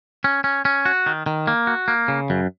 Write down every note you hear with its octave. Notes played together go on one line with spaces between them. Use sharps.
C#4
C#4
C#4
F#4
D#3
D#3
A#3
F#4
A#3
C#3
F#2